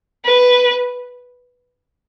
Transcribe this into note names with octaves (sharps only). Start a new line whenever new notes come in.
B4